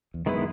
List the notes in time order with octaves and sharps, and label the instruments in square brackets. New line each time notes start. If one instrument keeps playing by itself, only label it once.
[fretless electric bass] E2
[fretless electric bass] F#2 [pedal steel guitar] D#3 G#3 B3 E4 B4